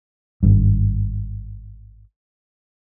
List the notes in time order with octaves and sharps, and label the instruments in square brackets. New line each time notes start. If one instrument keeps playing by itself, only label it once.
[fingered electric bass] G#1 G2